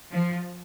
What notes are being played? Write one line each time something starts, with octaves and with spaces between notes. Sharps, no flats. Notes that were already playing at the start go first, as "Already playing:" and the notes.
F3